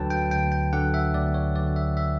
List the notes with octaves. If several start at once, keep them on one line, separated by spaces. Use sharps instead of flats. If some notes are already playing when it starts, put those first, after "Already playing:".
Already playing: D2 D3 F#3 B4 G5 A5
G5
D2 G5
G5
D3 F#3 F#5
E5
D2 D5
C#5
D3 F#3 D5
E5
E5